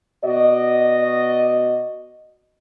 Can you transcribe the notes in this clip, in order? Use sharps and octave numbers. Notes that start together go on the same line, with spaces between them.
B2 F#4 D5 D#5